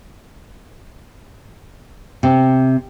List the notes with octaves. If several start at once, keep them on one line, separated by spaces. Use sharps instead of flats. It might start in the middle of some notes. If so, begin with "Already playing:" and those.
C3